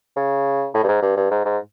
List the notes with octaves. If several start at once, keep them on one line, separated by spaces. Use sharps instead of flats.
C#3
A2
G2
G#2
G2
G2
G#2
G#2